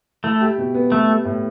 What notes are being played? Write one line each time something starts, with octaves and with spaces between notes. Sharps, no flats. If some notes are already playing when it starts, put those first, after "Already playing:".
A3 E4
G4
B2
B3
A3 B3
G4
A2